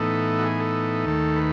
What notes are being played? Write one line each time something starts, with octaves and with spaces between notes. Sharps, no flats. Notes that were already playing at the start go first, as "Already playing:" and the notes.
Already playing: A2 E3 B3 D#4 A4
F#4
G#4
A4
D#2 D#3 A3
B4